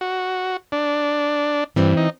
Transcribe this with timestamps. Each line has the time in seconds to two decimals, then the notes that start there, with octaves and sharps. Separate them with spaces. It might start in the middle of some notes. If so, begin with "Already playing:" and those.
0.01 F#4
0.72 D4
1.76 G2 E3 C4
1.97 D#4